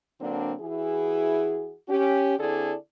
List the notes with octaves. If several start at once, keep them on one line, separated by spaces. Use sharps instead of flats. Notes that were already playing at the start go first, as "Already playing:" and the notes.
D3 F#3 A#3 C4 D4
E3 E4 F#4 G#4
C#4 G4
D3 C4 E4 G#4 A4 D5